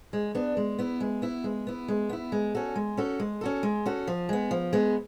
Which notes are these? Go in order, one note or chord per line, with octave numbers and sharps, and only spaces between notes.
G#3
B3 D4
G#3
B3 E4
G#3
B3 E4
G#3
B3 E4
G#3
B3 E4
G#3
C#4 F#4 A4
G#3
C#4 F#4 A4
G#3
C#4 F#4 A4
G#3
C#4 F#4 A4
F3
G#3 B3
F3
G#3 B3